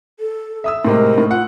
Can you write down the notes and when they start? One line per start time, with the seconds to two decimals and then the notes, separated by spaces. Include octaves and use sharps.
0.20 A4
0.64 E5 D#6 E6
0.85 A2 C3 G#3 A#4
1.18 A2
1.31 F4 F#5